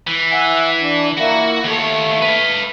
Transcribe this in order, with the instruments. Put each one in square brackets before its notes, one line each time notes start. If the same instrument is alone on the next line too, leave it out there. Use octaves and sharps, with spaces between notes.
[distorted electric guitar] E3
[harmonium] E5 F#5 G#5
D4
[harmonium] A#3 E4 [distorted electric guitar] F#4
[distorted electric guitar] D#2 C#5 [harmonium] A3
[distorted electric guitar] B4 F5